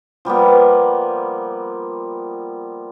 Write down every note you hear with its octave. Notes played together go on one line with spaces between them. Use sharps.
F3 G3 A#3 B3